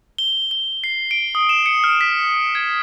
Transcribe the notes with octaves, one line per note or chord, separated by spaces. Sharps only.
G7
G7
C7
D7
D#6
E7
C#7
F6
B6
G#6